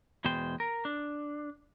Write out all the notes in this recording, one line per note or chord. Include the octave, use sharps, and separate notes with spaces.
E2 B2 G#3 C5 G5
A#4
D4